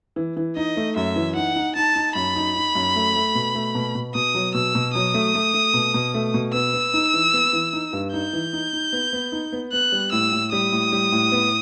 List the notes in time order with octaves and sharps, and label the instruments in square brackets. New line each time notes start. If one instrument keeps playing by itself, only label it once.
[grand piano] E3
E3
[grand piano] D#4 [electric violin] D#5
[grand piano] A3
[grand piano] F#2 [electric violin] E5
[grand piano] E3
[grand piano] D#4 [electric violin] F#5
[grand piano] D#4
[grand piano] D#4 [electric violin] A5
[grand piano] D#4
[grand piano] F#2 [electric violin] B5
[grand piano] D#4
D#4
F#2
A3
A3
B2
A3
B2
B2
[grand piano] B2 [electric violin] D#6
[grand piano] F#3
[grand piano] B2 [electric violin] E6
[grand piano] B2
[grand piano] F#3 [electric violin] D#6
[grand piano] A3
A3
A3
B2
B2
A3
B2
[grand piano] B3 [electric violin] E6
[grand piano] B3
D#4
E3
B3
E3
D#4
G2
[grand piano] D#4 [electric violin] G6
[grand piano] E3
D#4
D#4
B3
B3
D#4
B3
[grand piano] B3 [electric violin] F#6
[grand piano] G3
[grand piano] A2 [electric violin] E6
[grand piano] A2
[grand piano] G3 [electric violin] D#6
[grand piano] A2
G3
A2
B3